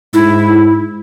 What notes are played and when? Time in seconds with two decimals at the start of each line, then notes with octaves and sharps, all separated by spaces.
0.14 G#2 E4